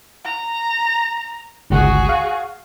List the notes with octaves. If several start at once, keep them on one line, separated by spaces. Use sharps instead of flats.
A#5
G1 C#2 F#4 G#4
F5